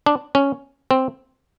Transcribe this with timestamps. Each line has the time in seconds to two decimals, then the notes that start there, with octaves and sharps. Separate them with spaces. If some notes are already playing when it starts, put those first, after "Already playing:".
0.06 D4
0.35 C#4
0.91 C4